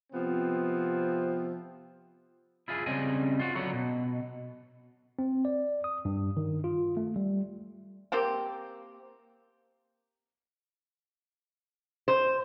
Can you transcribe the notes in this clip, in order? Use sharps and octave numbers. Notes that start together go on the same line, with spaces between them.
C3 F3 B3 C4
E4 F4 G#4
C#3 G3 C4 C#4 D#5 G#5
F4 F#4
D3 F#3 B3 C#5
B2
C4
D5
D#6
G2
D#3
F4
A3
G3
A#3 C4 G4
C5